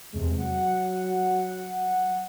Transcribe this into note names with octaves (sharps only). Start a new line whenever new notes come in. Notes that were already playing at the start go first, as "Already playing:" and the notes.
E2 C3 G#3
F#3 F#5